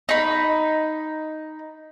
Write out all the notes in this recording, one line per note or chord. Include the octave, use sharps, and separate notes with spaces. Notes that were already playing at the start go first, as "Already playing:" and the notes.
D#4 B5